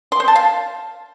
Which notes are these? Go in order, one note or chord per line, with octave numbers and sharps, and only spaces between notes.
C6
C5
A5
F5